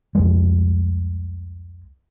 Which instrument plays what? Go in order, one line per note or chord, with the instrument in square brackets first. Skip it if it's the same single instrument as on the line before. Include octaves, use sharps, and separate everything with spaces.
[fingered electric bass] C2 F2 G#3